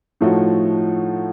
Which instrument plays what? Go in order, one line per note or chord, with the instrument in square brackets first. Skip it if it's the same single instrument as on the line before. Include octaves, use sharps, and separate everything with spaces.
[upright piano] A2 F3 A3 D#4 F#4